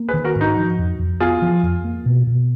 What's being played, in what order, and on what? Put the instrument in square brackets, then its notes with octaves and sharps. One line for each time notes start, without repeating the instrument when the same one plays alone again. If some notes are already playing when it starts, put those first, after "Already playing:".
Already playing: [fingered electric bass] A#3
[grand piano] G#4 B4
[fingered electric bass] D#3
[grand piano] F#4 A#4
[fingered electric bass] G#2
[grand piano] D#4 F#4
[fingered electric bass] F3
F2
F2
[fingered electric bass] B3 [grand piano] F4 G#4
[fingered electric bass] F3
F2
A#3
B2
B2